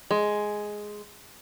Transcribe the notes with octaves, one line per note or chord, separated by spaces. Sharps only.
G#3